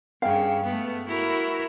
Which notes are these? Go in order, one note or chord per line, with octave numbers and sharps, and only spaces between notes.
G2 C#3 F5 G5
A3 B3
E4 F#4 A#4